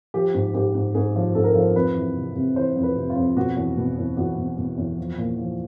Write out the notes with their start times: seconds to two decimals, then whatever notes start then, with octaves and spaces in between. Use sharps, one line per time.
0.14 F3 G4
0.34 G#2
0.54 G#2 G4
0.75 G#2
0.95 G#2 G#4
1.15 F3
1.35 G#2 A4
1.44 A#4
1.53 F3 A4
1.76 F2 B4
1.95 E3
2.16 C3
2.35 C3
2.56 E3 C5
2.76 F2
2.83 B4
2.96 C3
3.10 F4
3.16 F2
3.36 B2 F#4
3.57 E2
3.77 B2
3.97 E2
4.17 E2 F#4
4.37 B2
4.58 B2
4.78 E2
4.97 F3
5.18 A#2
5.38 F3